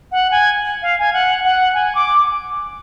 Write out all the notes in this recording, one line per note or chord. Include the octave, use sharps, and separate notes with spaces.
F#5
G#5
F5
G#5
F#5
F#5
G#5
D6